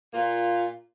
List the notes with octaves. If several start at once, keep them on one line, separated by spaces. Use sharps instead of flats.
A#2 A#3 F4